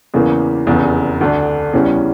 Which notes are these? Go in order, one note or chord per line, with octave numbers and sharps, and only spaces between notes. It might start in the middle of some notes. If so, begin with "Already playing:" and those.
E2 C#3 E3 A#3
F1 E2 C#3
D2 D3 A3 D4
E2 C#3 E3 G3 C#4